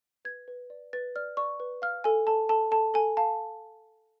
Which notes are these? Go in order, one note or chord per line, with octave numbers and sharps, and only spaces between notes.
B4 G#6
B4
D5
B4 A6
D5 F6
D5 C#6
B4
F5 F6
A4 G#5
A4 A5
A4 A5
A4 A5
A4 G#5
F5 A5